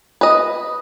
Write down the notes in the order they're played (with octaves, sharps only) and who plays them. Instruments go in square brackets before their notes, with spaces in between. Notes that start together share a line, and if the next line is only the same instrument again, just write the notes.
[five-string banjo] B4 D#5